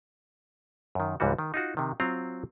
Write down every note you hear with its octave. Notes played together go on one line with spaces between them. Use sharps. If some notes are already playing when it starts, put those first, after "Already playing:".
F#2 D#3
C#2 G#2 E3 G3 F#4
D#3
D#4 F4 F#4
C3 D#3
F#3 C4 F4 A#5